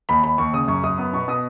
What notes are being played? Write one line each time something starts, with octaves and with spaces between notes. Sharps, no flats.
D#2 B5
D#2 B5
D#2 C#6
C#3 D#6
F#2 C#6
F#2 D#6
B3 D#6
B2 C#6
B2 D#6